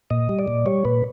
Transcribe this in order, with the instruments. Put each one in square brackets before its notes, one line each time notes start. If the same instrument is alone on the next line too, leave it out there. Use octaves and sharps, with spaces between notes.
[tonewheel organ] A#2 D#5
G3
D5
A#2
G3 C#5
A#2 B4